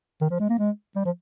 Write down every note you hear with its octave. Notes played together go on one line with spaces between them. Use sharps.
D#3
F3
G#3
A#3
G#3
G3
F3